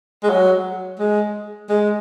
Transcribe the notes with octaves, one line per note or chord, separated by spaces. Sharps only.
G#3
F#3
G#3
G#3